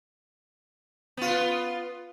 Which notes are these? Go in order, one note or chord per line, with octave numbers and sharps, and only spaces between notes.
B3 F4